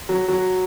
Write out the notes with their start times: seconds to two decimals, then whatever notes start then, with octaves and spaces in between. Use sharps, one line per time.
0.09 F#3
0.28 F#3